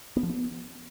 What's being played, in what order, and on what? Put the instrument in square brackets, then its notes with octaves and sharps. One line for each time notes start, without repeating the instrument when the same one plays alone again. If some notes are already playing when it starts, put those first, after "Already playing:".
[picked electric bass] B3
F3
B3